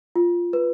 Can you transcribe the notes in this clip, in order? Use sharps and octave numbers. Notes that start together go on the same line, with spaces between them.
F4
B4